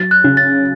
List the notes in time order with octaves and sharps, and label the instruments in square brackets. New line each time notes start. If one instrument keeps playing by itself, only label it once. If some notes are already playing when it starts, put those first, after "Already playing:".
Already playing: [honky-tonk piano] F#3 [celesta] A6
[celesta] F#6
[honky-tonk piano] C#3
[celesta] A6